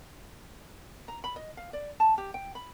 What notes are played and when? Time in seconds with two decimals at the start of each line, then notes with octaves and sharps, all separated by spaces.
1.08 A#5
1.24 B5
1.36 D#5
1.57 F5
1.73 D5
2.00 A5
2.18 G4
2.34 G5
2.55 B5